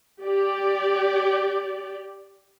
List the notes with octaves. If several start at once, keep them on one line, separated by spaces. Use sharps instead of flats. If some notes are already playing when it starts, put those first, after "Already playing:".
G4 D5